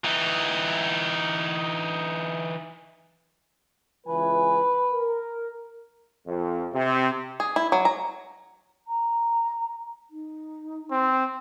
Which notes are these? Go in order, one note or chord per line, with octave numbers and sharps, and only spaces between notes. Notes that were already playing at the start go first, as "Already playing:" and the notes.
E3 D#4
C#2 E3 B4 G#5
A#4
F2
C3
G#4
E4
F#3
A#5
A#5
D#4
C4